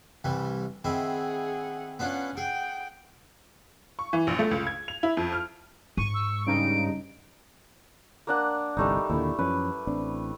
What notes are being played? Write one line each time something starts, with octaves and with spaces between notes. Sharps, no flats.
C2 E3 G3
D#3 C4 E4 G#4 F#5
B3 C#4 D4 F4 F#5
G#4 F#5 G5
C#6
E3
A#1
A3
C#2
G#6
F7
E4
F2
F6
G#2 C#6 D#7
E6
G2 C#3 D#4 D7
A#3 D4 F#5
G1 C2 G3 A3 D#4
D#2 A#2 D3 E4
F#2 F3 C#4 B4
A1 C4 D4